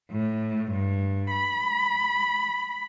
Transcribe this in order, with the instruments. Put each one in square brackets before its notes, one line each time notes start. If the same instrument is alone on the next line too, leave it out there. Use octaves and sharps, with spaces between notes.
[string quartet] A2
G2
B5